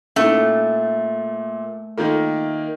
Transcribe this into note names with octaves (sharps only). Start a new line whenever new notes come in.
A#2 A3 C#4 D#4 E4
D#3 A#3 D#4 F4 A4